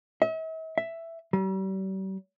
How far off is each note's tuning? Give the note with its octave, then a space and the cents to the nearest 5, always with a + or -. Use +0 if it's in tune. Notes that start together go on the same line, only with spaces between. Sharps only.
E5 -45
E5 +5
G3 -40